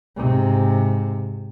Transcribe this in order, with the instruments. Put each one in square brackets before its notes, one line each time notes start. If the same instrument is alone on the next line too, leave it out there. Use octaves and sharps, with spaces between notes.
[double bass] G#2 C3